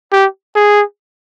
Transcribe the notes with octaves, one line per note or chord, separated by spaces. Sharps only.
G4
G#4